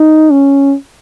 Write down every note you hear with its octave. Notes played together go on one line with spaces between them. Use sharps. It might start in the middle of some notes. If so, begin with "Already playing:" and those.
Already playing: D#4
C#4